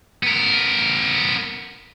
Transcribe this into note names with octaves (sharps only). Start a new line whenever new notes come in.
B3 A#4